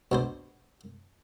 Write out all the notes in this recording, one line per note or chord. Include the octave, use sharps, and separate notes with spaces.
B2 D4 C5